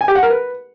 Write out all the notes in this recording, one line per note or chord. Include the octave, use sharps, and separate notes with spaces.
G#5
G4
F#5
A#4
B4